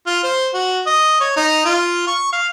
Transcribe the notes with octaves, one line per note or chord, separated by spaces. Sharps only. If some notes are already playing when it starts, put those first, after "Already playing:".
F4
C5
F#4
D#5
C#5
D#4
F4
C#6
F5